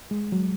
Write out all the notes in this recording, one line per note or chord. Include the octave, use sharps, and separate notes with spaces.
G#3
F#3